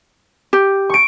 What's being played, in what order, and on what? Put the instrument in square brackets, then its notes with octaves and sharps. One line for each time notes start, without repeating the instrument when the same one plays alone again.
[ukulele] G4
[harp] C#6 D7